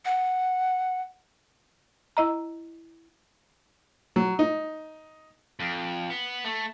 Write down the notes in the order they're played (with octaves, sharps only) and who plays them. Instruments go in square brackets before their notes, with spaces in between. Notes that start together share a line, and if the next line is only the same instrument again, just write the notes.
[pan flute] F#5
[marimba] E4 D#5 A#5
[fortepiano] F#3
D#4
[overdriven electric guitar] F2
B3
A3